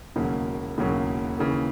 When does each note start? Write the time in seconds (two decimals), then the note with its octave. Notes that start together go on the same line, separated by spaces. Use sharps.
0.16 E1 D#2 C#3 F#3 A#3
0.78 E1 D#2 C#3 F#3 A#3
1.39 D#2 C#3 E3 A#3